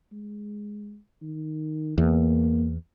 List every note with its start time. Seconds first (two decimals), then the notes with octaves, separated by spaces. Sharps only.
0.12 G#3
1.22 D#3
1.98 E2 A#3